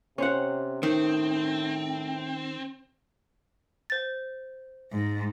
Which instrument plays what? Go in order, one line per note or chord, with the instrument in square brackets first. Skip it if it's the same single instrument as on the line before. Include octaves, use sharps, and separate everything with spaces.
[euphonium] C3 [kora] C#4 C5 F#5
[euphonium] A2 [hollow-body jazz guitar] D#3 [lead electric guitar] C4
[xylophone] C5 A6
[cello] G#2